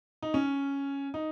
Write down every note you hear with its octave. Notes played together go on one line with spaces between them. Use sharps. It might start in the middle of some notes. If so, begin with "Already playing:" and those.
D#4
C#4
D#4